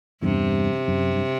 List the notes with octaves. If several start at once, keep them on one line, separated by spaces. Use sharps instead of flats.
E2 G2 C3
F#2
G2